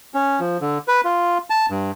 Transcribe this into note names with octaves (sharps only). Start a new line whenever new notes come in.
C#4
F3
D3
B4
F4
A5
G2